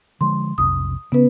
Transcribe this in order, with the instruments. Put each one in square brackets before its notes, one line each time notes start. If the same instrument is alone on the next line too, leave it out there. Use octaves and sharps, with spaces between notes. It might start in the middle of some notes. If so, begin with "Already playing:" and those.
[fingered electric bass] D3 F3 G#3 [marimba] C6
[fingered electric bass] B1 F2 C3 [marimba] D#6
[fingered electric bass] C#3 [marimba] B3 C#4 B4